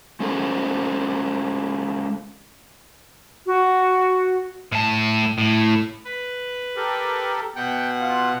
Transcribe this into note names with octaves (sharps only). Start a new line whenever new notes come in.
G#3 C#4 A4 A#4 C5
F#4
A2 A5
A2
B4
G4 A4 A#4
B2 F#5 G5
F4